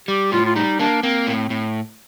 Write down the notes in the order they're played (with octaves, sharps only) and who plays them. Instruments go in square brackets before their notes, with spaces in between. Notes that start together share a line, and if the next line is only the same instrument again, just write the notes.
[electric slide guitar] G3 [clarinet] G4
[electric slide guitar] A2 [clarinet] F4
[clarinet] F4
[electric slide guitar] G3 [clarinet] D#4
[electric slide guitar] A#3 [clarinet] D4
[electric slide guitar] A#3 [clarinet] C4
[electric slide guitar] A2
A2